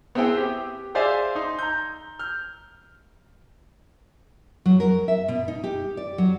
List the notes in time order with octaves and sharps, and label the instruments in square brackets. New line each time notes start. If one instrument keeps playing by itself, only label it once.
[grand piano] B3 C4 E4 G#4 G5
G4
G#4 C5 D5 E5 F5 G#5
D#4 C6
A#5 G6
F6 G6
[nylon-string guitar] F#3
A#4
E5
B2
D#4
G4
D5
F#3